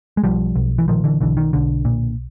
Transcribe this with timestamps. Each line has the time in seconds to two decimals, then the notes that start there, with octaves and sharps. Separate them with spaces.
0.17 G#3
0.23 B1 F3 G3
0.56 B1
0.78 E3
0.88 A#2 D#3 F3
1.04 D3 E3
1.21 B1 D3 E3
1.37 D#3
1.53 B1 D3
1.85 A#2